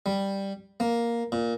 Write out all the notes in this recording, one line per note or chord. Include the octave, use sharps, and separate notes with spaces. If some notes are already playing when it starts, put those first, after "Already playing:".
G3
A#3
A#2